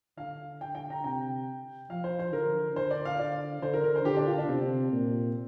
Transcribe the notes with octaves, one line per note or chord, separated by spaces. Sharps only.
D3 F5
G5
G5
A#5
C3 G5
F3 F5
C5
C5
D3 A#4
D3 C5
D5
F5
D5
D3 C5
A#4
A#4
C5
D3 G4
D4
F4
D4
C3 C4
A#2